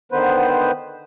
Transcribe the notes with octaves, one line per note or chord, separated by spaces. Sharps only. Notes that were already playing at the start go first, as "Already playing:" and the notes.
D3 D#3 B3 B4 C5